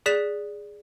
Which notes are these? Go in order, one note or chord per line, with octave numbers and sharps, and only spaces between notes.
G#4 D5 F#6 B6 E7